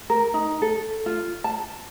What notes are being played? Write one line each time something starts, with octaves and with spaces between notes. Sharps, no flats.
A#4
D#4
A4
F4
A5